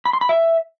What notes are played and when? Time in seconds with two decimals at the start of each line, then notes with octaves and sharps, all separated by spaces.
0.06 B5
0.13 C6
0.21 B5
0.29 E5